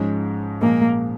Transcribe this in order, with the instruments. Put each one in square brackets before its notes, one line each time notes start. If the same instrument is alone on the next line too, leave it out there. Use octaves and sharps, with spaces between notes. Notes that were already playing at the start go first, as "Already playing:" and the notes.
Already playing: [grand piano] G#2 F3 G#3 C#4
[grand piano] A#2 F3 G#3 [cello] A#3